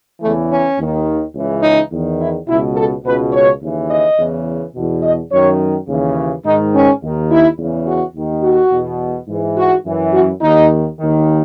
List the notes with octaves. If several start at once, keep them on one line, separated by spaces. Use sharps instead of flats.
E2 C#3 E3 A3
C#4
D#2 D#3
C#2 C#3 E3
D#4
E2 D#3
E4
C#2 B2 E4
A4
C#2 B2 B4
C#5
D#2 C#3 E3
D#5
E2 C#3 E3
E2 B2
D#5
F#2 D#3 C#5
D#2 C#3 E3
G#2 D#3 D#4
C#4
D#2 D#3
E4
E2 C#3 E3
F#4
D#2 D#3
F#4
E2 B2
G#2 E3
F#4
F#2 E3
F#4
D#2 D#3 D#4
D#2 D#3